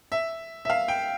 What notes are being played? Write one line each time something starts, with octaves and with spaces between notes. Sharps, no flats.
E5
E5
F5
G5